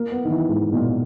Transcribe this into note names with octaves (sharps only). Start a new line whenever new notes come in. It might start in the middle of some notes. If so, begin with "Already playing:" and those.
Already playing: A#3
B3
D#3
E3
G#2
B2
A#2